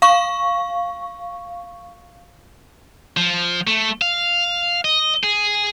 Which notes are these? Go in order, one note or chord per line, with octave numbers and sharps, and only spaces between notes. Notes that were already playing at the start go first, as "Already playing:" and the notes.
F5 C#6
F3
A3
F5
D#5
G#4